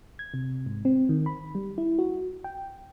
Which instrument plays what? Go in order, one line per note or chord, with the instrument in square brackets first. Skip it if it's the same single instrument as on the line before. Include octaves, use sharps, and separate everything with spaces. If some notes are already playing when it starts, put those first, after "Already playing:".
[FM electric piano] G#6
C3
G#2
C4
D#3
B5
G3
E4
F#4
G5